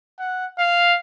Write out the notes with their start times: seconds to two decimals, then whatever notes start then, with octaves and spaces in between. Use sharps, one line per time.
0.19 F#5
0.58 F5